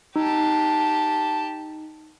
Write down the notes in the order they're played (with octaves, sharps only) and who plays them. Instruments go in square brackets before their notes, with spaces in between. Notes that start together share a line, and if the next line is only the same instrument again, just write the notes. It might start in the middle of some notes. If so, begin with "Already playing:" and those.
[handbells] D#4 [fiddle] G4 A5